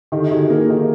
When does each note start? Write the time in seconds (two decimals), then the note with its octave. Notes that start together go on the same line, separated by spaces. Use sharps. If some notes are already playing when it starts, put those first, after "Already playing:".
0.12 D#3 G4 A4
0.31 D#3 F#4 G#4
0.50 A#3 G#4 A#4
0.70 D#3